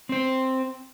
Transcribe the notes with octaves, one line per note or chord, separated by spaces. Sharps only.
C4 C5